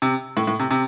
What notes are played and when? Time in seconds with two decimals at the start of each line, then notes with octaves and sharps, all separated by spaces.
0.02 C3
0.37 A2
0.47 A2
0.59 C3
0.71 C3